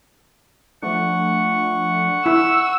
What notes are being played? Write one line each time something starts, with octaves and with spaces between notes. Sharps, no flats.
F3 A3 D4 F#5 C#6
E4 E6